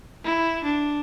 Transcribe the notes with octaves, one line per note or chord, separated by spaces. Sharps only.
E4
D4